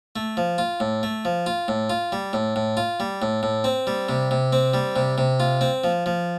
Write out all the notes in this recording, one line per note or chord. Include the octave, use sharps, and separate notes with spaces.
A3
F3
F4
A2
A3
F3
F4
A2
F4
G3
A2
A2
F4
G3
A2
A2
C4
G3
C3
C3
C4
G3
C3
C3
F4
C4
F3
F3